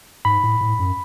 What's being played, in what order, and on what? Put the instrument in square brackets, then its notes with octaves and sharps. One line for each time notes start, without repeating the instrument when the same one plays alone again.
[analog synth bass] G#2 [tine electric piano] B5
[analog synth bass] A2
A2
F#2